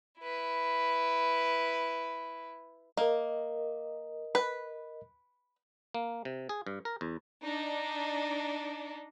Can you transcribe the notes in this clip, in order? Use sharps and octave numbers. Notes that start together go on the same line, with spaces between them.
E4 B4
A#3 A#4 D#5
B4
A#3
C3
G#4
G2
A#4
E2
D4 D#4